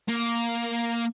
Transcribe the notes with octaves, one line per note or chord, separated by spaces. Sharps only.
A#3